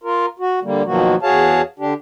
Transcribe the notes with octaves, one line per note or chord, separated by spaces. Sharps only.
F4 A#4
F#4
D3 G3 A#3
B2 D#3 F3 F#3 A#3 F#4
E2 F#4 G#4 C#5 F5 A5
D3 D4 G4